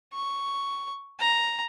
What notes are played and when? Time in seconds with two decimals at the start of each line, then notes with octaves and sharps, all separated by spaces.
0.13 C#6
1.20 A#5